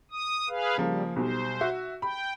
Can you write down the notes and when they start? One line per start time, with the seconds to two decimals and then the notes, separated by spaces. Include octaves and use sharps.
0.11 D#6
0.49 G#4 B4 F5
0.78 C#3 F3 G3 A#3
1.16 B1 B2 G3 C5
1.61 F#4 E5
2.02 G5 B5